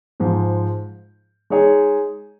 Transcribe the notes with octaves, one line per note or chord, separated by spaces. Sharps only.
G#2 F3 G#3
G#3 D#4 G#4 C#5